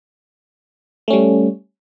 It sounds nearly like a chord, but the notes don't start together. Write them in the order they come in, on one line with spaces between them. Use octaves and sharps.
A3 C#4 G3